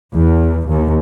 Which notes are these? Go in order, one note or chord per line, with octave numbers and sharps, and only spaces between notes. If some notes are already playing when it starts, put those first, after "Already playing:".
E2
D#2